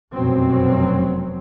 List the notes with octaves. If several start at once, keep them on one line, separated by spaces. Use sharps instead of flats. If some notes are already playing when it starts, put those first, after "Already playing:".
F1 F#2 B2 F#3 C4